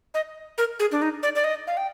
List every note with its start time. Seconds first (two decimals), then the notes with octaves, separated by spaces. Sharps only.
0.14 D#5
0.58 A#4
0.79 G#4
0.92 D4
1.02 D#4
1.23 D5
1.36 D5
1.44 D#5
1.67 F5
1.77 G5